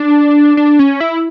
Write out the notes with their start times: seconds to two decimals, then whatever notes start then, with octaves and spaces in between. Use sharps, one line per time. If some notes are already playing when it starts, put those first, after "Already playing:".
Already playing: D4
0.57 D4
0.79 C#4
1.00 E4